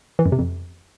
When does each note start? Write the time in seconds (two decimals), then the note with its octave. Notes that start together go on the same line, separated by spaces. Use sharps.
0.19 E3
0.26 F#2
0.32 C3
0.39 F2